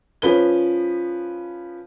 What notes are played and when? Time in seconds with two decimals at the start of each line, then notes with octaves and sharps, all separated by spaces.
0.22 F3 C#4 B4 G7